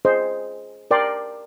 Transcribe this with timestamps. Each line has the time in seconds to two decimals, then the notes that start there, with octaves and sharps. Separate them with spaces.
0.05 G#4 C5 D#5
0.91 A#4 D5 G5 C6